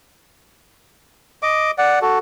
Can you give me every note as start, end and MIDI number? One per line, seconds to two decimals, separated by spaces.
1.43 1.71 75
1.43 1.71 86
1.78 1.99 74
1.78 1.99 78
2.02 2.19 66
2.02 2.19 69